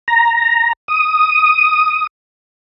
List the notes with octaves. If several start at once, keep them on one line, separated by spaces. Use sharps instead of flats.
A#5
D#6